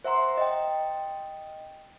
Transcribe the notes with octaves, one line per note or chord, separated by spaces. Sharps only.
C5 E5 F#5 A#5 C6
D#5 G5